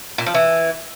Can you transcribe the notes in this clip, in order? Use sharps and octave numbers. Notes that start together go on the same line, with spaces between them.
A#2
F3
E3